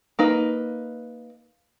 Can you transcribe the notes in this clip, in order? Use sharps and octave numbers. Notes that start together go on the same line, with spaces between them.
A#3 D#4 B4